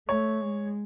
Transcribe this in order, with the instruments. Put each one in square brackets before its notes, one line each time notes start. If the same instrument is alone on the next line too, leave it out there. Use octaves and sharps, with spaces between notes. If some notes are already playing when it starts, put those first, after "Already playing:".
[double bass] A3 [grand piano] C#5
[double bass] G#3